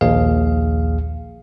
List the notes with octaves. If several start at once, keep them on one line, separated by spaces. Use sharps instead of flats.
A#1 D#2 G#4 F5